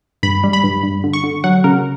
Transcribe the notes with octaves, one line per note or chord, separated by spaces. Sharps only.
G2 B5
G3
B5
G2
G2
D3
C#6
D3
F#3 F#5
C#3 A#4